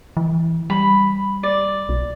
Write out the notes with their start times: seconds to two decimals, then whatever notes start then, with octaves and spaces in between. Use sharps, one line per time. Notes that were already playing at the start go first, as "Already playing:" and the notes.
0.17 E3
0.70 G3 B5
1.43 D5
1.89 B1